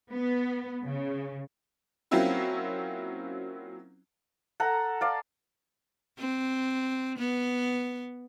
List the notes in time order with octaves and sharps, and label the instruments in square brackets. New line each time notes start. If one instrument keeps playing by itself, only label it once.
[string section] B3
C#3
[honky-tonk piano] F#3 A#3 C4 C#4 E4 F4
[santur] A4 F#5 A#5
D5 F5
[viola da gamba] C4
B3